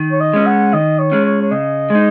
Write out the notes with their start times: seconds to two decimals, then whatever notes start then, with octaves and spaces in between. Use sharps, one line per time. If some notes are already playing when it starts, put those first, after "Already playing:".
Already playing: D#3
0.12 C#5
0.21 D#5
0.33 G#3 C#4
0.46 F#5
0.73 D#3 D#5
0.99 C#5
1.12 G#3 C#4
1.25 C#5
1.42 C#5
1.51 C#3 D#5
1.90 G#3 D#4